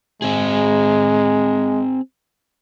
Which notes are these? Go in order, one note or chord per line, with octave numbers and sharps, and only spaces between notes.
G#3 C4 G#4